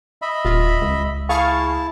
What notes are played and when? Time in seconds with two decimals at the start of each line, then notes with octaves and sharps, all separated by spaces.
0.22 D#5 E5 B5
0.45 D#1 F4
0.81 C#2
1.29 E4 G#4 F5 A5 C#6